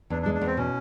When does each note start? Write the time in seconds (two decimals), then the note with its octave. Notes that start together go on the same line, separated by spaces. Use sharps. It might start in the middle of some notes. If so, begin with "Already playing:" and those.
0.10 E2 D4
0.22 D4
0.26 G#3
0.34 D4
0.41 E2 C4
0.57 B2 C#4